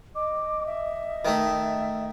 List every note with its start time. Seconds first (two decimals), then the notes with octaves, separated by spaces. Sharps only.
0.15 D#5 D6
0.66 E5
1.25 D#3 A3